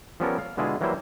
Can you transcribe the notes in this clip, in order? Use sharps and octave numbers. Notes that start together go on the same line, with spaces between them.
F3 G3 B3 C#4 A4 A#4
F5
B2 D3 G#3 E4 F4 G#4
E3 F#3 G3 A#3 E4 C5